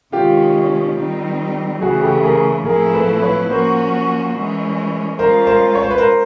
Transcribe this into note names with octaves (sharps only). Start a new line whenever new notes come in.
C3 D#3 G#3 C#4 F4 G4
D#3 G3 C4 D#4
C#3 E3 A3 F#4 G#4
G4 A4
G#4 A#4
A2 F3 A3 C4 E4 G#4 A#4
A4 B4
B4 C#5
F3 A#3 C#4 F#4 A#4 C5
E3 G#3 C#4
G#3 C#4 F4 A#4 C5
A#4 C5
C#5
C5
B4
A#4 C5